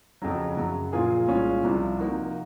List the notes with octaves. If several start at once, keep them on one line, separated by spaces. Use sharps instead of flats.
F2 C#3 F#3
F#2 C#3 F#3
A#2 F3 A#3 F4 G#4
C2 A#2 G#3 C#4 F4
C2 C3 F3
C3 F3 A#3 D#4 F#4